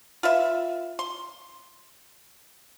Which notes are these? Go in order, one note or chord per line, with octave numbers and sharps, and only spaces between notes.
F4 B4 E5
C6